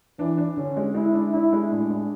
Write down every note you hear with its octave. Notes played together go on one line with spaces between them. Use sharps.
E3 D4
D4
D3 C#4
G#3
G#3 E4
D4
D4 E4
G#3
A2 D4
G#3